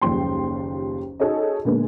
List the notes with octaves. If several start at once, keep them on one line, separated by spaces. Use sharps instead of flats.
F#1 D#2 F3 G3 G5 C6
D#4 F#4 G#4 A4 C#5 D#5
A#2 D3 G#3 A#3 B3